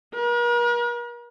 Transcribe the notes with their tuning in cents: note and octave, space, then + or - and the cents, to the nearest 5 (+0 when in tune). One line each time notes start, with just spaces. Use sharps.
A#4 +45